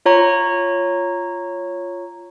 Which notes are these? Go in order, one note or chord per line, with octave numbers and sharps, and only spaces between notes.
F4 C#5 A#5 C#6